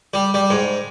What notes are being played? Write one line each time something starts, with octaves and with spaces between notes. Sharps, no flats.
G3
G3
G#2